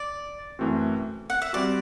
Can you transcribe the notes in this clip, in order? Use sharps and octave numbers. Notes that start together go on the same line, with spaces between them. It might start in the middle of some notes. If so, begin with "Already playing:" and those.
Already playing: D5
F#2 E3 A3 C4 F#4
F#5
E5
G3 C4 F#4 D5